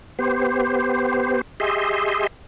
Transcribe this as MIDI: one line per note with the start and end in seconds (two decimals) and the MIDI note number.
0.19 1.41 59
0.19 1.41 67
0.19 1.41 72
1.60 2.27 67
1.60 2.27 68
1.60 2.27 75
1.60 2.27 76
1.60 2.27 84